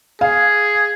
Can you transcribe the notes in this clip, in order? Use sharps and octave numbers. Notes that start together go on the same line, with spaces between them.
G#4 F5